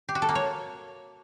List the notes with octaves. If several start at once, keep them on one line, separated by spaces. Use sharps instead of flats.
G4
F#4
A4
A#3
C#5